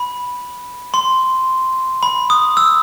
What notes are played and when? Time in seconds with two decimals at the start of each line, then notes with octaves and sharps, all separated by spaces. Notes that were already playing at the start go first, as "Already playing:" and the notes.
Already playing: B5
0.94 C6
2.03 B5
2.30 D#6
2.57 E6